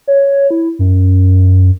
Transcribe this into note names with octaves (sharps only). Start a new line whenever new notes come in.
C#5
E4
F#2